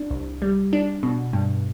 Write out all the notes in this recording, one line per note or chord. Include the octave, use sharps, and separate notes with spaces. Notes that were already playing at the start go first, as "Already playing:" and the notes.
Already playing: D4
C2
G3
D4
B2
G2